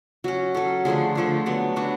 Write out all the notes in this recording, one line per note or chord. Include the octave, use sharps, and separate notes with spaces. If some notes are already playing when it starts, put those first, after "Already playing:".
F#3 C#4 F#4
F#3 C#4 A4
D3 F3 A3 D4 G#4
D3 F3 A3 D4
F#3 B3 D4
F#3 B3 D4 F#4